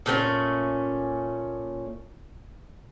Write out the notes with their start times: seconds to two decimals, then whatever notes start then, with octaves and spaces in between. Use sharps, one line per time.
0.06 A#2 A3 C4 C#4